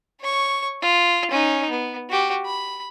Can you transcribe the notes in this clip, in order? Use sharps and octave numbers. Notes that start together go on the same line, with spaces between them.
C#5 C#6
F4
C#4 D#4
B3
F#4 G4
B5